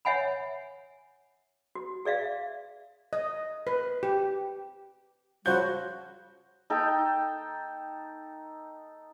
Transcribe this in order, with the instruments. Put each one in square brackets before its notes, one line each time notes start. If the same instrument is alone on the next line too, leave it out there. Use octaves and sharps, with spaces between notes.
[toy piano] C#5 E5 F#5 G#5 B5
F#4
G#4 D5 E5 F5
[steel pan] D#5
B4
G4
[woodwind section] C#3 F3 G3 [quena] F#4 [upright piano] G6
[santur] D#4 A4 G5